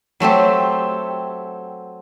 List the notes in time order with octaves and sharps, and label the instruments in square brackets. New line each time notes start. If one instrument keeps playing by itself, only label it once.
[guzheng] F#3 A3 C4 G4